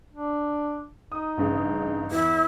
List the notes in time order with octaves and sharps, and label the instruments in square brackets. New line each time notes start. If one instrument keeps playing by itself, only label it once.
[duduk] D4
[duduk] D#4 [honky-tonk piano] D#6
[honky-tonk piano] A1 G2 C#3
[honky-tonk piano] E2 [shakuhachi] E4